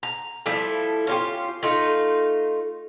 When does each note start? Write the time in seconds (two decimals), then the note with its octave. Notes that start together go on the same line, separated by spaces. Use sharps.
0.03 A#5
0.46 F3 G3 A3 E4
1.07 C#4 F4 G4
1.63 A3 D#4 F4